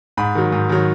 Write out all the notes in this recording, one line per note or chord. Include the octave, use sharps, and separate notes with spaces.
G#2 B5
D#3 F#3
G#2
D#3 F#3